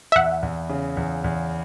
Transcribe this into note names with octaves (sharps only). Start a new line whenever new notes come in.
E5
E2 F#5
E2
C#3
E2
E2